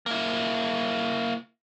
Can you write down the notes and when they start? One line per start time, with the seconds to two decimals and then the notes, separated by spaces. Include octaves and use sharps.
0.06 A#3 E4